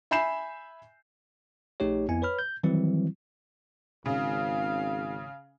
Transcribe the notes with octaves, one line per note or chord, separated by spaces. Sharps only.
E5 G#5 B5 G6 C7 E7
A#1 A3 D#4 G4 C#5
F2 B3 E4 G#5
B4 C#5 B5 F6
G6
D#3 E3 F#3 G3 C4 E4
G#1 C#3 F5